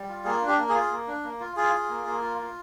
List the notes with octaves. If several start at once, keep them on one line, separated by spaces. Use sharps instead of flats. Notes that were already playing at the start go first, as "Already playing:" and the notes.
Already playing: G3
F4
A#3 G#4
D4
G4
A#3
G#4
F4
A#3
D4
A#3
F4
F4 G#4
F4
A#3
A#3
F4
F4